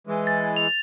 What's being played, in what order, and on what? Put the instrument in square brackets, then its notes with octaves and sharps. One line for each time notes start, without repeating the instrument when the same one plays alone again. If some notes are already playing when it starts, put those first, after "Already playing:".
[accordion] E3 G#3
[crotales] A6
F7